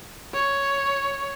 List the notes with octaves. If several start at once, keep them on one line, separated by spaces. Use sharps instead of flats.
C#5